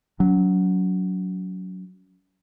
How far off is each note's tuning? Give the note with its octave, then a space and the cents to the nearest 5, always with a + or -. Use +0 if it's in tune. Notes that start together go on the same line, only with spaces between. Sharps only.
F#3 +0 C#4 +40